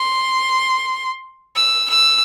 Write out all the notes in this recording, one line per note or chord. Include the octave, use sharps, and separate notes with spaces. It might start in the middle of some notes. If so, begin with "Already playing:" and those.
Already playing: C6
E6
E6